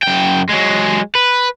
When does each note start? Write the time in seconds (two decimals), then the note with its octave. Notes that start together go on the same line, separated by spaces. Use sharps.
0.03 F#2 G5
0.50 F#3 G#3
1.15 B4